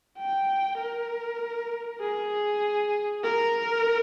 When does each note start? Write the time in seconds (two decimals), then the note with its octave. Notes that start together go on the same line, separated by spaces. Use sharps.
0.18 G5
0.79 A#4
2.01 G#4
3.23 A#4